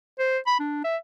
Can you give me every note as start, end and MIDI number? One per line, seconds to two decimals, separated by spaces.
0.19 0.38 72
0.46 0.57 83
0.60 0.81 62
0.84 0.97 76